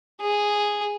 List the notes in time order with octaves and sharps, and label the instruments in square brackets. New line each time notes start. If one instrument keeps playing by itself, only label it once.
[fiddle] G#4